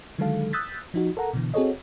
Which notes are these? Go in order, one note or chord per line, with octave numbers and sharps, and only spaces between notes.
D3 D#3 F#3 G#3 A4 F5
D#6 E6 F#6 G6 A6 B6
F3 D#4 F#4
A4 A#4 F#5 A#5
B2 D3 E3
C4 F#4 G#4 A4 C#5 D#5